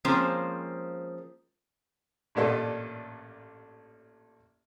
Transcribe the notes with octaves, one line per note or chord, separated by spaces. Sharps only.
F3 G#3 A#3 C4 C#4 C5
A1 G2 A#2 D4 A4 D#5